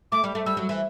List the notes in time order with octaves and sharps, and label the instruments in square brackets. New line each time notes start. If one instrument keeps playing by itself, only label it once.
[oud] A3 [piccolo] D6
[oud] G3
A3
[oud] G3 [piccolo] E6
[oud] F#3
E3